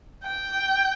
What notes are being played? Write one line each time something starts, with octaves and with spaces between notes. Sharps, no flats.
G5